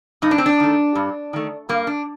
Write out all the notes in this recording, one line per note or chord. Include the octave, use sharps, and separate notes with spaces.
G2 D#4
D4
C4
D4
D#3 A3
G2
D#3 A3
G2 A#3
D4